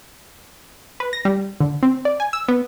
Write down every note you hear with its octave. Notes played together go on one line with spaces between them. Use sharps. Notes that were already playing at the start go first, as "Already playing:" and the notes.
B4
A#6
G3
D3
C4
D5
G#5
E6
B3